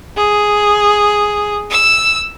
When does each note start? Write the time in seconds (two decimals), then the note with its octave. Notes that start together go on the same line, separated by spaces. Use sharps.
0.17 G#4
1.71 E6